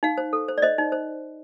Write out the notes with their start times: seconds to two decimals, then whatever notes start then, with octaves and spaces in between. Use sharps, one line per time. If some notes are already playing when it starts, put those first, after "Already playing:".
0.03 D#4 F5
0.18 C5
0.33 A4
0.49 C5
0.58 D5
0.62 C5 D#5
0.78 D#4
0.92 C5